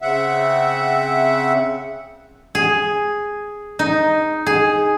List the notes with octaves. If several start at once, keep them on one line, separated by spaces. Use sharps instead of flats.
C#3 C4 E5 F#5
G#4
D#4
G#4